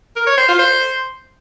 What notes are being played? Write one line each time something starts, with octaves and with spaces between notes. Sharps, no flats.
A#4
C#5
C5
F4
C5